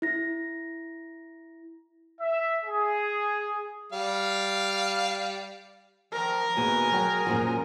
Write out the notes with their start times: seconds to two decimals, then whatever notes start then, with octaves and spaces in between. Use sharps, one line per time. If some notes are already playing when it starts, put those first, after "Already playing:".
0.02 E4 A#6
2.21 E5
2.65 G#4
3.93 G3 F5
6.13 D#3 F3 A#4
6.57 D#2 B2 B3 G#4 G#5
6.92 F#3 G5
7.26 F#2 A#2 F3